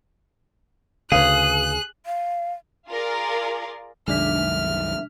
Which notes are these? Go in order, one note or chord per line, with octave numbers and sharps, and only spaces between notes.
D2 C#3 G#4 B4 F5 F#6
F5
F4 G#4 A#4 D5
C2 F#2 D#3 G#3 D4 E5 F6 B6